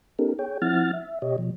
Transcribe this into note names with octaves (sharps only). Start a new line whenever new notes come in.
B3 C#4 D#4 G4 A4 A#4
G#4 C#5 G5
F3 C4 E4 F#5 F6 A6
E5
B2 G4 C#5 D#5
B2 F3